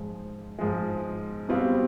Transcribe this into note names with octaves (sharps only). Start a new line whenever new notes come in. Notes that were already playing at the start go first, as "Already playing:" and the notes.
Already playing: G#2 F3 G#3
G#2 F3 G#3
B2 G3 C4 F4